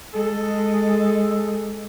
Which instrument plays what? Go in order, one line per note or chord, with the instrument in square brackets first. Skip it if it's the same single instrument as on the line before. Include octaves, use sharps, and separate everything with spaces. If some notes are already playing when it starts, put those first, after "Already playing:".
[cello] G#3 [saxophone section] A4